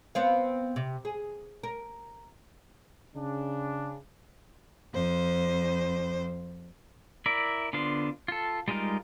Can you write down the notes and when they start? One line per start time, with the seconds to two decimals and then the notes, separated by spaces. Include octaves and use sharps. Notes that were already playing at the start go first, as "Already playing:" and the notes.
0.15 B3 C4 F5
0.76 C3
1.05 G#4
1.63 A#4
3.15 C#3 D4
4.93 F2 C5
7.26 E4 A#4 D5 E5
7.73 D3 B3 D4 F4 C5
8.28 F4 A4
8.68 G3 G#3 D#4 F4 A#4